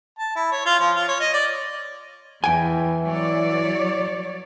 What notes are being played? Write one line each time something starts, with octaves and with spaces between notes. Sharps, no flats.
A5
E4
C#5
F4
F3
F4
C#5
D#5
D5
E2 E3 G5 G#5
F#3 C#5 D5